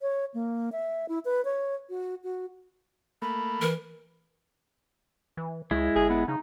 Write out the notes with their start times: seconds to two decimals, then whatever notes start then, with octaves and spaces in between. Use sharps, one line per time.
0.01 C#5
0.34 A#3
0.72 E5
1.09 E4
1.25 B4
1.45 C#5
1.90 F#4
2.24 F#4
3.22 A3 A#3 B5
3.61 E3 A#4
5.37 E3
5.71 C#2 G#3 E4
5.96 G1 G#4
6.10 B3
6.28 C#3 D#4